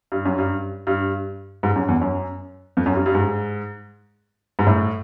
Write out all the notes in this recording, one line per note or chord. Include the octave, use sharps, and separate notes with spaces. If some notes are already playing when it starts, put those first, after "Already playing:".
G2
F#2
G2
G2
G#2
F#2
E2
F#2
F2
F#2
G2
G2
G#2
G#2
A2